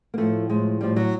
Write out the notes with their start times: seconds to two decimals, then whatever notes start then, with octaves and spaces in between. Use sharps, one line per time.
0.14 A#3
0.18 A2 F3 A3
0.49 A2 F3 G#3
0.81 A2 F3 G3
0.96 F#3